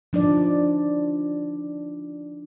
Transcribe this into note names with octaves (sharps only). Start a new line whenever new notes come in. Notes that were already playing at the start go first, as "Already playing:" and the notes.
F3 D4 D#4 D5